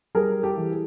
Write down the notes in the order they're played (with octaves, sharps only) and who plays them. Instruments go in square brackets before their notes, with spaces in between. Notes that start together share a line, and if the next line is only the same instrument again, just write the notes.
[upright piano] G3 G#4 A#4
G4 A4
E3
G#4